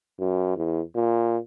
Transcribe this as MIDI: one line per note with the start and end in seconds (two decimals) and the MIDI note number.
0.20 0.56 42
0.56 0.81 40
0.95 1.38 46